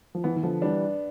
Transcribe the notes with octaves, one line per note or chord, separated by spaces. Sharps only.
F3
E3 B3
E3
D3 F3
E3 G3 D4